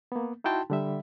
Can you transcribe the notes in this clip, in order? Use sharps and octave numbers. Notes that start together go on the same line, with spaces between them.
A#3 B3
D#4 E4 F#4 G5 A5 C6
D3 G3 E5